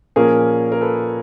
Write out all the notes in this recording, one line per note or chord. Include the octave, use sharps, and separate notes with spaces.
A#2 F3 A#3 C#4 G#4 A#4
A#4
A4 B4